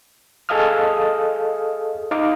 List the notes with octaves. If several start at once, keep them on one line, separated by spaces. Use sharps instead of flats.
G#4 A4 D#5 F5 D#6 F6
D#4 F5 D6